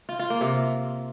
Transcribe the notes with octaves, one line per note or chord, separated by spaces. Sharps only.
F4
F4
A#3
C3